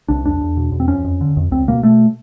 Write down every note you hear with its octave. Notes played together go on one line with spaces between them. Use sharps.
C2 D4
E2 D4
E2
B2
E2
C4
F2 C#4
F2
D3
F2
C#2 C4
B2 A#3
B2 A3